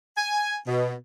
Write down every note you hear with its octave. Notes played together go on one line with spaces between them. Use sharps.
G#5
B2